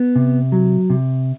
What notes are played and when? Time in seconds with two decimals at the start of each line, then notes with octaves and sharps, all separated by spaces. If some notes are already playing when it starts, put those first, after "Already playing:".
Already playing: B3
0.16 C3
0.52 F#3
0.90 C3